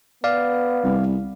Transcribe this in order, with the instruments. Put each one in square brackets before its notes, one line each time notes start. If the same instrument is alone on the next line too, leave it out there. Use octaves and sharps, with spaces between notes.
[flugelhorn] B3 [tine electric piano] D5 F5
[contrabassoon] C2